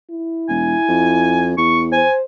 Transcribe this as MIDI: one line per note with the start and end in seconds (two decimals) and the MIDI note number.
0.11 1.63 64
0.49 0.75 28
0.49 1.51 80
0.88 1.54 41
1.58 2.03 40
1.58 1.82 85
1.92 2.23 72
1.92 2.12 80